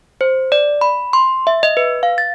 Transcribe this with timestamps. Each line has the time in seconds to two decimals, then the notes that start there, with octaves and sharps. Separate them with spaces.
0.21 C5
0.52 D5
0.81 B5
1.13 C6
1.47 E5
1.63 D#5
1.77 B4
2.03 F5
2.18 A6